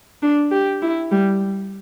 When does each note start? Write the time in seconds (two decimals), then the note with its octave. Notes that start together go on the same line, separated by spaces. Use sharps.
0.22 D4
0.51 G4
0.82 E4
1.11 G3